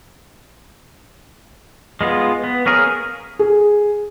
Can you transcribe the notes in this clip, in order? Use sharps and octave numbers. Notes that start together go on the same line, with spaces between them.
G#3 B3 F4
B3
A#3 C#4 G#4 A#4
G#4